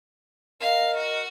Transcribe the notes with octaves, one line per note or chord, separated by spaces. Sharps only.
A#4 D#5 F5 F6
F#4